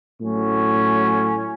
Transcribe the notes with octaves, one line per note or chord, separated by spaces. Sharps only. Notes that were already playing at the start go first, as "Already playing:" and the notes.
A2 F#3 C#4